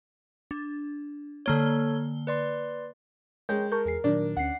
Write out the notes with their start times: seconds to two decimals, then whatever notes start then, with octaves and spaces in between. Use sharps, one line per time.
0.51 D4
1.46 D3 A#3 A4 C#5 G7
2.27 B4 D5 C6
3.49 G#3 A#4 C#5 G5 G6
3.72 A#4 A5 C#6 G6
3.86 E2 G#4 C7
4.04 A#2 D#3 F#3 D4
4.37 D2 C#4 F#5 C7